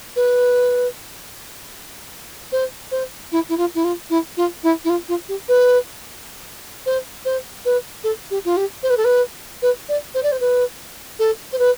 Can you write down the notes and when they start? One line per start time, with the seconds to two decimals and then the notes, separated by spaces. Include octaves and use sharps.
0.16 B4
2.52 C5
2.91 C5
3.32 E4
3.49 E4
3.57 F4
3.75 E4
3.84 F4
4.10 E4
4.37 F4
4.63 E4
4.84 E4
4.89 F4
5.09 F4
5.29 G4
5.48 B4
6.86 C5
7.25 C5
7.65 B4
8.04 A4
8.31 G4
8.45 F4
8.57 G4
8.83 C5
8.90 B4
8.97 A4
9.05 B4
9.62 B4
9.89 D5
10.14 C5
10.23 D5
10.32 C5
10.40 B4
11.19 A4
11.52 C5
11.59 B4